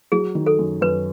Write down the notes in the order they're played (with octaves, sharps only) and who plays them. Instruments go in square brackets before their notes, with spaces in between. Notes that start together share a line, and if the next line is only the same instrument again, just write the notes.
[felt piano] F#3 [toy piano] G#4
[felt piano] D#3
[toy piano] A4
[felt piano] F#2
[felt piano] F#2 [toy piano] B4